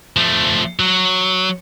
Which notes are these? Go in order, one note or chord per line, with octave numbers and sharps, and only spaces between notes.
F3 A3
F#3